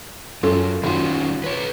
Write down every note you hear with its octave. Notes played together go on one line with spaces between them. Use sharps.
F#2 C#4 F4 A4
D#3 G3 C#4 F4 F#4
B4 C#5